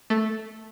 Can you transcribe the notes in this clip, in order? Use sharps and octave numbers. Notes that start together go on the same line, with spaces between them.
A3